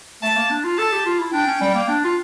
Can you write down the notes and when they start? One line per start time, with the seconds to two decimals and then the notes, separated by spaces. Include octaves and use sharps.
0.23 A3 A5
0.36 A#3
0.51 D4
0.64 F4
0.78 A4 A5
0.92 G4
1.06 F4
1.20 E4
1.33 D4 G5
1.47 C#4
1.61 G3
1.75 A#3
1.89 D4
2.04 F4